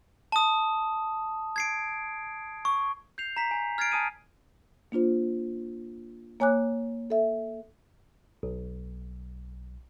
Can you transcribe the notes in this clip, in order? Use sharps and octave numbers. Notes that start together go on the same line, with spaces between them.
A5 D#6
G#6 C7 D7
C#6
G6 C7 F7
A#5 B6
G#5 A#5
F6 G#6 A6 C7 D7
G#5 A5 D#6 D#7
A#3 D4 F4 C5
A#3 C#5 G#5 D6 F#6
A4 E5
B1